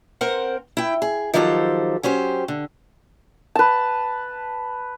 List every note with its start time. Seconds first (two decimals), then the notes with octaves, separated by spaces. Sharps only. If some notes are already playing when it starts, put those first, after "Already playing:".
0.21 C4 A#4 C5 F#5
0.77 E4 G5
1.02 G#4
1.34 D#3 F3 F#3 G4 A4 C5
2.03 F#3 C#4 G4 C5
2.48 D3
3.55 B4 A5